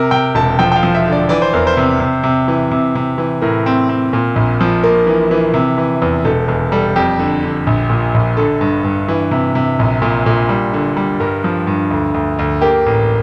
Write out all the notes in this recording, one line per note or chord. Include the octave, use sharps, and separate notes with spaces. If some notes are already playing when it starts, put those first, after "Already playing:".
Already playing: C3 A#4
C3 G5
E1 A5
F3 G5
G5
F5
F3
E5
D3
D5
E3 D5
C5
E2 A#4
C5
C3
C3
C3
E3
C3
C3
E3
A2 A#4
C4
C4
A#2
A#1
F3
A#3
E3
E3
C3
E3
E2
E1 A4
E2
G3 A4
F2 G4
D3
D3
A#1
A#2
A#1
D3 A4
G2
G2
E3
C3
C3
A#1
A#2
A#2
G3
D3
G3
G2 A#4
F3
G2
D2
D2
D2
A#3 G4
A1